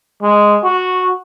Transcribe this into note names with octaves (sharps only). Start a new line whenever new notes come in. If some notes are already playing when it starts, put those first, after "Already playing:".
G#3
F#4